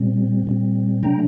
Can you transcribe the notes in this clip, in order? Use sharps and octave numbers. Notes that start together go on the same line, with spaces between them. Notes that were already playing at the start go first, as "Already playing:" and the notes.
Already playing: A#2 G3 C4
A#2 G3 C4
C3 F#3 A3 D4 G5 A#5